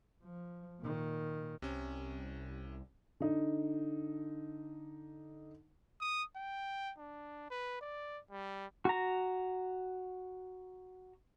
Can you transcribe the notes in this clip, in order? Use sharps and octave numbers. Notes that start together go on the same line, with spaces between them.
F3
A#2 D#3
C2 C3 C#4
D3 D#4
D#6
G5
D4
B4
D5
G3
F#4 A#5